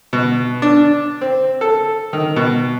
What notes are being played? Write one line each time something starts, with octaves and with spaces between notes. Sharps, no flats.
B2
D4
C4
A4
D#3
B2